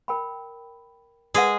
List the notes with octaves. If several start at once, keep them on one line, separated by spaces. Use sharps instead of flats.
A#4 G5 B5
G#3 G#4 A#4 B4 F#5